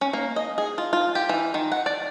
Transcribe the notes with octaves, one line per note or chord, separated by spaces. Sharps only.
C#4
A#3
D#5
G#4
F4
F4
G4
E3
D#3
F#5
D5